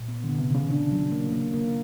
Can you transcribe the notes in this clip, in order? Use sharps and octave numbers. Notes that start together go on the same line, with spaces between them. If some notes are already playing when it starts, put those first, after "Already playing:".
Already playing: A#2
B3
D3 B3
C3
D#3
C#3
D4
F#3
A#3
A#3
A#3